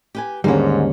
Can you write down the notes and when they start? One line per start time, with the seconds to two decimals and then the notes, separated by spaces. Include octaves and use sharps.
0.15 G4 B4 G#5
0.44 D#2 G#2 D3 G3 A#3 B3 C#4